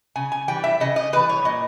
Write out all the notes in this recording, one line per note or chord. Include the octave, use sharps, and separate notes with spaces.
C#3 G#5
G#5
E3 G3 G5
E5
C#3 D#5
D#5
E3 G3 B4
C#5
A#2 D#5